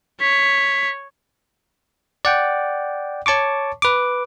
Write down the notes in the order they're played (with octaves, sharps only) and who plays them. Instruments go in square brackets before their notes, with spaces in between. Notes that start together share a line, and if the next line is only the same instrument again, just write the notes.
[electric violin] C#5 [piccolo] B6
[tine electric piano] D5 F#5 G5
C#5 A5 C#6 D6
B4 D6